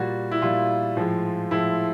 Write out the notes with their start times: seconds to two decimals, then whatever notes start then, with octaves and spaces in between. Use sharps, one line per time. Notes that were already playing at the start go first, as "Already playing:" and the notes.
Already playing: A#2 G3 F#4
0.31 E4
0.42 A#2 G3 F4
0.96 A2 F3 G#3
1.51 A2 F3 G#3 E4